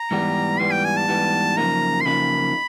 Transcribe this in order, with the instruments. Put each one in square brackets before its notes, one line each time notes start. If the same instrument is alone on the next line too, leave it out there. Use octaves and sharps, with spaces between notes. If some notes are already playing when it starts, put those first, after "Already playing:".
Already playing: [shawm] A#5
[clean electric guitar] G#2 E3 G3 B3
[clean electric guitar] G#2 E3 G3 B3 [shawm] C6
[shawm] G5
G#5
A5
[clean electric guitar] G#2 E3 G3 B3
[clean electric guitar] F#2 C#3 F3 A#3 D#4 [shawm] A#5
[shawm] C6
[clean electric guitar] F#2 C#3 F3 A#3 D#4 [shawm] B5